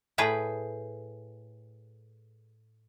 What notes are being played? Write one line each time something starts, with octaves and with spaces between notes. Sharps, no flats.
A2 G#4 B4 G5